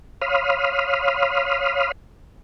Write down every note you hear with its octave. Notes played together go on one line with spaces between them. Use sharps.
C#5 F5 B5 C6 D#6 F6